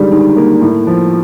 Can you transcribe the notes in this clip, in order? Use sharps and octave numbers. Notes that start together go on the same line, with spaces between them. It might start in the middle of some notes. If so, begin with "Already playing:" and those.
Already playing: D3 D#3 G3 G#3
D#3
A#3
A2
F3